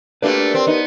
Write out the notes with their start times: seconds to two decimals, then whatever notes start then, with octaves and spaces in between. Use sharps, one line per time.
0.22 A3 A#3 D4 G4 A#4 B4
0.55 C4
0.67 B3 D#4